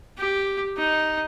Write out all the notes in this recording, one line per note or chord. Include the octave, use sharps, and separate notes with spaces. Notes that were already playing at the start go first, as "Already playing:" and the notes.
G4
D#4